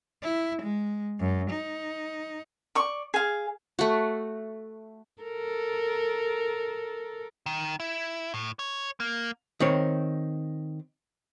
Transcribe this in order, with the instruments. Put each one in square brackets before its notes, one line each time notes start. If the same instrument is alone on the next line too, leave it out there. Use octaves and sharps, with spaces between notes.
[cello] E4
G#3
F#2
D#4
[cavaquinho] D5 C#6
G#4 F5
[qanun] A3 F#4
[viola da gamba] A4 A#4
[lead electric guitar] D#3
E4
A2
C#5
A#3
[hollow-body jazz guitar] D#3 C4 C#5